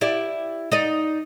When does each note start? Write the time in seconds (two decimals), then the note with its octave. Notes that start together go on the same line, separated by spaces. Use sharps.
0.01 E4 G4 D5
0.72 D#4 D5 D#5